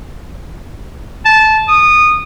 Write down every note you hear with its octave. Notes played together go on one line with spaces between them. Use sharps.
A5
D#6